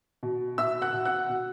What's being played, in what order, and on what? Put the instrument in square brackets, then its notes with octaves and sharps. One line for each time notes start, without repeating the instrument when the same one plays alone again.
[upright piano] B2
B2 E5 E6
F#5 F#6
B2
F#5 F#6
B2